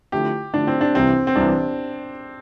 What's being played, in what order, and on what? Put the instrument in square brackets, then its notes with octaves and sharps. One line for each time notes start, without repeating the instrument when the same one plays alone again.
[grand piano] D3 F3 A3 E4 [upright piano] G4
[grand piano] D3 F3 A3 E4 [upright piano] D4
[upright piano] C4
D4
[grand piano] C2 C3 E3 [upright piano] C4
[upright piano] C4
[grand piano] C2 C3 E3 [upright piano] D4